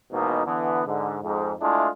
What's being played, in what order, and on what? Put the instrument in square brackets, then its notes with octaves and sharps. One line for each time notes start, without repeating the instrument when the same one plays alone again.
[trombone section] G#1 E2 G#2 B2 A#3 D#4
D3 E3 B3
G#2 D3
F2 G#2
G#3 A3 D4 E4 F4 G#4